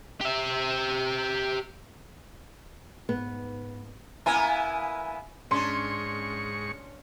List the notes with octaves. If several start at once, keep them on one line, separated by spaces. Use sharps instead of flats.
G4 E5
G#2 B3
A#3 B3 E4 G#5
G#2 C#4 D4 C6 C#6